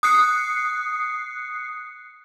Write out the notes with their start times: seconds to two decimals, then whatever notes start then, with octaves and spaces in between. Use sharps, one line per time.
0.03 D#6 F#6 C7 C#7